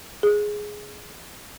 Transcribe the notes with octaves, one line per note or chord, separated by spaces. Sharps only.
G#4